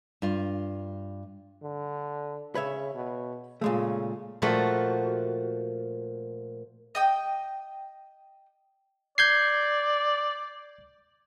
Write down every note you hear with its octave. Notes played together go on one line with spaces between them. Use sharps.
G2 F4
D3
C#3 B4 C#5 E5
B2
A#2 C#3 G#3 A3
A#2 F3 A3 F#4
D#5 G5 D#6
D5 G6 G#6 C7